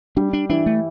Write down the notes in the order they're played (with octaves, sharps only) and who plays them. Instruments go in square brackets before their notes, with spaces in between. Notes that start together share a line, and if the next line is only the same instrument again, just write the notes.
[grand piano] G3 G4 [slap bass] D4
[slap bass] D4
[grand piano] E3 E4 [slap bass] D4
[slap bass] A3